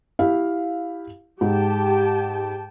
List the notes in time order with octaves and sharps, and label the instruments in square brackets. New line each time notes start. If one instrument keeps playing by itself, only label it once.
[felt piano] E4 G4 F5
[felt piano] G#2 [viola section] G4 G5 A5